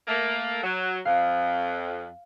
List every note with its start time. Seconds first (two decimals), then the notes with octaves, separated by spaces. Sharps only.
0.07 A3 A#3
0.62 F#3
1.05 F2 F5